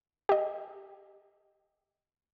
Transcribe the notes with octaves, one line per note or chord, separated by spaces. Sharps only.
G4 D#5